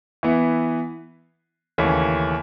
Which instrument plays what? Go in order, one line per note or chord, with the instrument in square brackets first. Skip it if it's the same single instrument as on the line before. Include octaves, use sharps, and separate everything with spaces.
[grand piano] E3 B3 E4
D#2 C#3 E3 A3 C#4